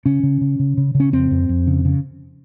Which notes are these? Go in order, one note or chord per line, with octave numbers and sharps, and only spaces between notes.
C#3 C#4
C#3
C#3
C#3
C#3
C#3
C#4
F2 C4
F2
F2
C#3
C#3